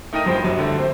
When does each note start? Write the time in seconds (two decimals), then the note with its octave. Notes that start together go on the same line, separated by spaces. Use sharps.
0.13 A3 D#4 A#4 G5 A#6 D#7
0.25 B1 G2 F3 C5 G5
0.44 A#1 G2 F#3
0.59 D3 A3
0.78 C4 C5